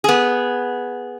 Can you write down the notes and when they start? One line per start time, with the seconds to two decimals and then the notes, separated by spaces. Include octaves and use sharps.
0.04 B3 G#4